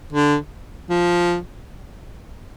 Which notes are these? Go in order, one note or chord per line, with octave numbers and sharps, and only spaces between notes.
D3
F3